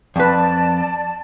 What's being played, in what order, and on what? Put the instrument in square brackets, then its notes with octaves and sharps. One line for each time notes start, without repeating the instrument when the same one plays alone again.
[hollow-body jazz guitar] F2 B4 [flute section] D5 A5